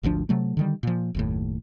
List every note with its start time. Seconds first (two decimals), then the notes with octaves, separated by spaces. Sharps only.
0.03 G#1 D2 F3 D4
0.29 C3 F#3 A3
0.57 D3 D#3 G3
0.83 A#2 F3
1.15 F#1 D#2 A2